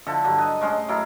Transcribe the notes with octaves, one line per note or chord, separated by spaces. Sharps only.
D3 F3 E4 A4
G2 D3 F#3
B4 D#5 A5
A2 G#3 C#4 C5
F#3 E4 A4 A#4